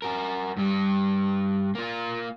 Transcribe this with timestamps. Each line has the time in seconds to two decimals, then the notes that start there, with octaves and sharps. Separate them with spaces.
0.02 F#4 A#4
0.57 G2 G3
1.75 A#3 F4